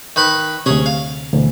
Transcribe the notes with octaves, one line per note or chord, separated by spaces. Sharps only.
D#3 B4 B5
D2 C3 C#4 G#4
F5
D2 B2 E3